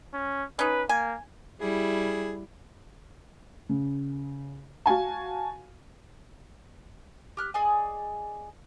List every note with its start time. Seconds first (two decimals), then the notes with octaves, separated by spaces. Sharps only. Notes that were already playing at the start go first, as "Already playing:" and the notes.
0.14 C#4
0.59 C#4 D#4 B4
0.89 A#3 G#5
1.61 G3 E4 G#4
3.69 C#3
4.86 F#4 F5 G#5 A5
7.37 G4 F6 F#6
7.54 G#4 D5 D#5 G#5